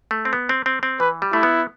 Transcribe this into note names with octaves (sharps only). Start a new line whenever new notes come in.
A3
C4
B3
C4
C4
C4
E3 B4
G3
A3 E4
B3